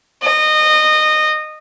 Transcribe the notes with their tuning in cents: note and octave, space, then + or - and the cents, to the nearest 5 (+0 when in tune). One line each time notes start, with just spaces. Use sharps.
D#5 -20